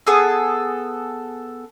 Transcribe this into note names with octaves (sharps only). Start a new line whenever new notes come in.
B3 G#4 A4